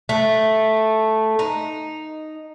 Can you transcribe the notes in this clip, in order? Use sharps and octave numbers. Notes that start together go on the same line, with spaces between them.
A3
D#4